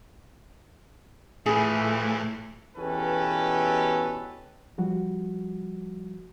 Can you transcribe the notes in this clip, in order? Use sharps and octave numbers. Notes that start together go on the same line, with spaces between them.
A2 E3 F3 A3 G#4
E2 B2 C#4 G4 A4 B4
F3 G3 F#4